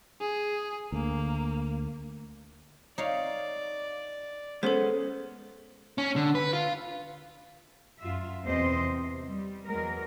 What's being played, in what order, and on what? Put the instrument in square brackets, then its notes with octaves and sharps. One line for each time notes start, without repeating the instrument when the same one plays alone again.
[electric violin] G#4
[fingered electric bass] D2 [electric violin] A#3
[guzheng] D#4 C#5 F5 [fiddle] D5
[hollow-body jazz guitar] G#3 B3 C#4 [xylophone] A4 C5
[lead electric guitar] C#4
D3
B4
F4
[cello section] F#2 F4 E5
E2 B2 C4 C5 D#5
C3
G3
E2 F#3 G#3 A#4